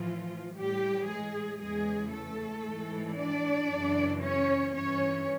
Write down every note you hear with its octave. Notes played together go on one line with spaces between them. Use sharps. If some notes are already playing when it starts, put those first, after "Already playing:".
Already playing: A2 E3 F3 F4
A2 E3 G3 G4
G#3 G#4
E2 C#3 E3 G#3 G#4
A3 A4
G#2 E3
D4 D5
F#2 C#3 E3
C#4 C#5
G2 E3 C#4 C#5